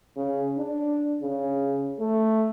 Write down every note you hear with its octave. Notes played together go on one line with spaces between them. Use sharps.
C#3
D4
C#3
A3